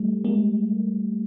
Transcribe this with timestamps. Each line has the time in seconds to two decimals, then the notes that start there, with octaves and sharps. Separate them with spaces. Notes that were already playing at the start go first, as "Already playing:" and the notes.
Already playing: G3 A3
0.24 G#3 A#3